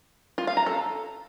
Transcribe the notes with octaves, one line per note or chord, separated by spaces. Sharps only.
F4
F5
A#5
A4